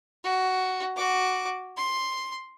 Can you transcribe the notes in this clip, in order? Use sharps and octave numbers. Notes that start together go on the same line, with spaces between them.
F#4
F#4 D6
C6